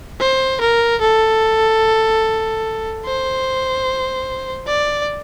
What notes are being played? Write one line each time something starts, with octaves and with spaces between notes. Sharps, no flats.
C5
A#4
A4
C5
D5